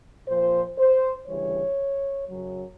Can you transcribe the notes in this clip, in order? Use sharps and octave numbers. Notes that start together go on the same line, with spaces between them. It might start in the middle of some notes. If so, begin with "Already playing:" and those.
A#2 F3 C5
C5
D2 C#3 E3 G3 C#5
F#2 C#3 F#3